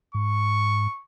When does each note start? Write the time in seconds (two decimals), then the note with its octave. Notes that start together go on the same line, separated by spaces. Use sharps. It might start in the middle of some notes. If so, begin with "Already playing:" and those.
0.15 G#2 C#6